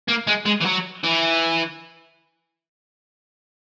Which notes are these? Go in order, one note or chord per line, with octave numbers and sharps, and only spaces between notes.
A#3
G#3
G#3
E3
F#3
E3